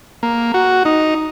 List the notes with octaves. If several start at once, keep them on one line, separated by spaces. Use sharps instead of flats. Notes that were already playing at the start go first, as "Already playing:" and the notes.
A#3
F#4
D#4